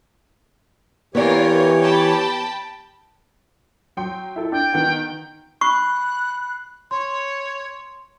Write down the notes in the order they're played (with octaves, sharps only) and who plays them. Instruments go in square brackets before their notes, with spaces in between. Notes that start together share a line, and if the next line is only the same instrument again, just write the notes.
[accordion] E3 C#5 [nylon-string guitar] B3 D5 [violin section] F4 A#4 [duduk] G4
[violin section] G5 A5 B5
[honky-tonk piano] F#3 G5 C6
E4 A4
[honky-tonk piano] D4 [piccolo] G5
[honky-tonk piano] D#3 B3 F#5
[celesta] B5 C7 [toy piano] C#6 [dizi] F#6
[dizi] C#5 [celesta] C6